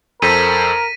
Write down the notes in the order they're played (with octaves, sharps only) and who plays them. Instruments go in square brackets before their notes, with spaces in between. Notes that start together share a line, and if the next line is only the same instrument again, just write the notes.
[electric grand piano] F2 A4 C5 [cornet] A#4 [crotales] A#6 B6 D#7